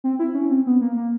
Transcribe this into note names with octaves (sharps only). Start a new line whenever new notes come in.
C4
E4
C#4
C4
B3
A#3
A#3